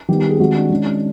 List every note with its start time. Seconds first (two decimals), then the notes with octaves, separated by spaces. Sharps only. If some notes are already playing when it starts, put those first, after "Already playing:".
0.08 D#3 G3 B3 G4
0.19 G4
0.29 G#4
0.35 G4
0.39 D#3 G#3 C4 F#4
0.56 D4
0.70 D#3 G#3 C#4